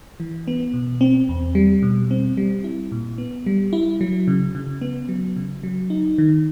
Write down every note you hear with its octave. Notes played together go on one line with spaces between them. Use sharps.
E3
B3
B2
C4
E2
G3
B2
C4
G3
E4
A#2
B3
G3
E4
F#3
C#3
C#3
B3
F#3
C#3
F#3
D#4
D#3